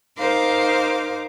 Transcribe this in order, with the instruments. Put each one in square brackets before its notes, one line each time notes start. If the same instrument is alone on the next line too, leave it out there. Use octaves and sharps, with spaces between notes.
[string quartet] D#4 A#4 C5 F5 D6